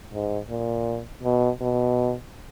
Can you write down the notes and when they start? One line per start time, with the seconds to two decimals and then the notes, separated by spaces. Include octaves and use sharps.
0.13 G#2
0.49 A#2
1.23 B2
1.61 B2